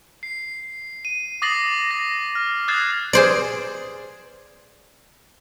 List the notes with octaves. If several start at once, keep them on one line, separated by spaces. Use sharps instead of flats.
C7
D#7
D6 D#6 A6 A#6 C7 F#7
A#6
F6
D#6 F#6 G#6 A6 C7 E7
G#4 C5 D5